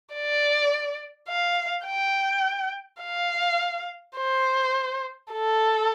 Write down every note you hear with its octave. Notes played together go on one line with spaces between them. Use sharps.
D5
F5
G5
F5
C5
A4